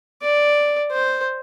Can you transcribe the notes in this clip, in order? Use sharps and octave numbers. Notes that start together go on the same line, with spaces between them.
D5
C5